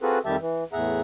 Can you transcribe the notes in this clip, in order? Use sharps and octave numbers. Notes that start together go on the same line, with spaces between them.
C4 F4 F#4 G#4 A4 B4
F2 D#3 G3 G4 E5 A5
E3
E2 A2 G#4 E5 F#5 A#5